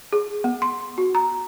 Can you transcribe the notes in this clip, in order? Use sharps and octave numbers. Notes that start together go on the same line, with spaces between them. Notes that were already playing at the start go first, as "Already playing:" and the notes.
G#4
B3
C6
F#4
A#5